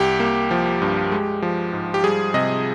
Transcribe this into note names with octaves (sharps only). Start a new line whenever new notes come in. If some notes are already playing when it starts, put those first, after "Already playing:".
Already playing: C2 G4
A#3
F3
G2
G#3
F3
G#2
G4
G3 G#4
C3 D#5